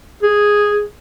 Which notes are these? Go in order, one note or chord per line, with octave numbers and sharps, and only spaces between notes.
G#4